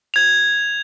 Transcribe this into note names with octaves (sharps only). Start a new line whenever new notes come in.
G#6 F7